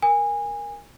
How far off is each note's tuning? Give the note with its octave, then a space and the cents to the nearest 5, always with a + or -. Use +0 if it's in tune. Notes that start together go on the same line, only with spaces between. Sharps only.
A#4 +0 G#5 -25